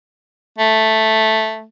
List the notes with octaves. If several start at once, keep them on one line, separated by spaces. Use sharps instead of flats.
A3